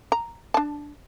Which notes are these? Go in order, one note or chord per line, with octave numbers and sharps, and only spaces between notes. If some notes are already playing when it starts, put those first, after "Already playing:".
A#5
D4 A5